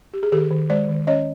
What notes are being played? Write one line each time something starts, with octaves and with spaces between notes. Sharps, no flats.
G4
G#4
D#3 G4 A4
D#3
G#3 C5 D5
D#3
C#4 C#5 D#5